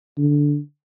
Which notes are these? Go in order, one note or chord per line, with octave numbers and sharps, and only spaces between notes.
D3